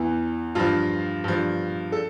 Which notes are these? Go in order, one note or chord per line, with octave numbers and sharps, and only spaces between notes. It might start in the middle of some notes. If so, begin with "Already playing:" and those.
Already playing: E2 E3
G2 F3 F4
G2 F3
A4